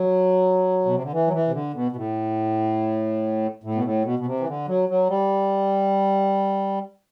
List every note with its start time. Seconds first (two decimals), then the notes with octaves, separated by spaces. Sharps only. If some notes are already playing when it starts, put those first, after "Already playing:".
Already playing: F#3
0.85 B2
0.94 C3
1.03 D3
1.12 E3
1.27 F#3
1.33 E3
1.48 C3
1.53 D3
1.74 B2
1.92 B2
1.96 A2
3.64 A2
3.75 B2
3.84 A2
4.05 B2
4.19 B2
4.26 C3
4.40 E3
4.48 D3
4.68 F#3
4.89 F#3
5.09 G3